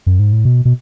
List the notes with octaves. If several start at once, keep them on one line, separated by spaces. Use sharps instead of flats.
F#2
G#2
A2
B2
B2